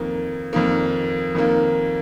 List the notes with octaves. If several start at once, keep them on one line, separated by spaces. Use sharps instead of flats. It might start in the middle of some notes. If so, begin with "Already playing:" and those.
Already playing: F2 D#3 A#3
F2 D#3 A#3
F2 D#3 A#3